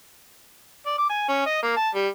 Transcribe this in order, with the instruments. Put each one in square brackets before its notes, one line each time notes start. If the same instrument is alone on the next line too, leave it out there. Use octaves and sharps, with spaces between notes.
[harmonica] D5
D6
G#5
C#4
D#5
A#3
A5
G3